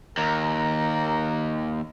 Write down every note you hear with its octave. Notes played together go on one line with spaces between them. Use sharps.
D#2 A#4